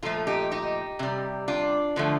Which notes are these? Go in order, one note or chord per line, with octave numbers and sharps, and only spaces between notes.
A#2 F3 A3 F4 A4
D#4 G4
D#4 G4
C3 G3
D4 F4
D3 F3 A3